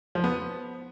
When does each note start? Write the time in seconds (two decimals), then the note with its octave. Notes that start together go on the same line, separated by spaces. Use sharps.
0.15 F3
0.24 B3